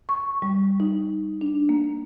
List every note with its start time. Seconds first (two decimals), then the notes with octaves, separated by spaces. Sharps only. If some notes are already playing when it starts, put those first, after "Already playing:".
0.09 C#6
0.42 G3
0.80 D#4
1.41 D4
1.69 A#3